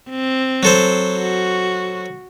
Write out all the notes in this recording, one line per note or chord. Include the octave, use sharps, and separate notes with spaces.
C4
F#3 A4 C5
F#4